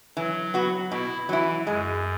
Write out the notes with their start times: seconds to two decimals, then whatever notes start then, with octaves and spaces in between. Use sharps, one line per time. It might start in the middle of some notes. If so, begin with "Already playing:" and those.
0.17 E3 F#3
0.54 B3 F#4
0.92 B2 E4
1.29 E3 F#3 E4
1.67 F#2 G#3